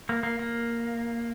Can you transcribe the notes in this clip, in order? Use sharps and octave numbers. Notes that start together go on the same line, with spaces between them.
A#3
A#3
A#3